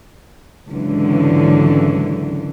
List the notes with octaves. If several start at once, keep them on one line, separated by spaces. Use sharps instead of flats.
G#1 C#2 D3 E3 F#3